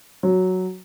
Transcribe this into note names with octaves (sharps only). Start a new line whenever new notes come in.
F#3